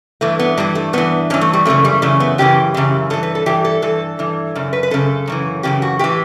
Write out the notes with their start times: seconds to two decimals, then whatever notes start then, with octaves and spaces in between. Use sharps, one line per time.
0.21 G2 E3 A3
0.39 B3
0.57 G2 E3 G3
0.75 A3
0.93 G2 E3 B3
1.30 G2 E3 C#4
1.41 A3
1.53 G3
1.65 F#2 C#3 E3 A3
1.85 G3
2.02 F#2 C#3 E3 A3
2.20 B3
2.38 F#2 C#3 E3 G4
2.74 F#2 C#3 E3
3.10 G2 E3 A4
3.23 B4
3.35 A4
3.46 G2 E3 G4
3.65 A4
3.82 G2 E3 A4
4.19 G2 E3
4.55 F#2 C#3
4.73 B4
4.83 B4
4.91 F#2 C#3 E3 A4
5.27 F#2 C#3 E3
5.63 F#2 C#3 E3 G4
5.82 F#4
5.99 A2 E3 G4